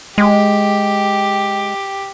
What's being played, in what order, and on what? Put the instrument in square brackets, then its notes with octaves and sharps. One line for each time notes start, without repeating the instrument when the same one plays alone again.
[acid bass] G#3 [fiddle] G4